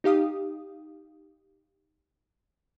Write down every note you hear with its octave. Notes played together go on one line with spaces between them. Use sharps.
D#4 G4 F5 D#6